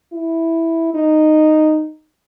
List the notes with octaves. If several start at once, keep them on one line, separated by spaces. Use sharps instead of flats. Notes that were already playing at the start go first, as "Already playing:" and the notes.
E4
D#4